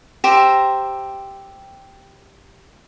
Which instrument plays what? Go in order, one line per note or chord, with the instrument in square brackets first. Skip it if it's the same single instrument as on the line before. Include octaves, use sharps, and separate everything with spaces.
[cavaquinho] G4 C5 E5 A#5